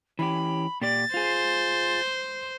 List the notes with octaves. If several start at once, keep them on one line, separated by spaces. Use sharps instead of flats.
E3 C#4 G4 B5
A#2 G4 D5 A6
F4 G#4 C5